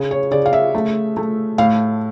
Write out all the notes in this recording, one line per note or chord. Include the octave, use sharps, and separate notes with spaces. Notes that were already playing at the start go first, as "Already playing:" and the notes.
Already playing: C#3
C#5
C#3 D5
F5
E5
A3
A3
A2 F5